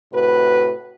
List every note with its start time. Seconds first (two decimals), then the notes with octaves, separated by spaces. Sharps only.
0.12 A2 C3 F#4 B4